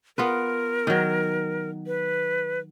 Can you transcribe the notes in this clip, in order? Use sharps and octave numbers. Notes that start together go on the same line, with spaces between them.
B3 F4 A#4 B4
D#3 F#3
B4